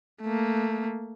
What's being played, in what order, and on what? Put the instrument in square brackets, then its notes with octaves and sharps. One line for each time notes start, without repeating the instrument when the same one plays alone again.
[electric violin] A3 A#3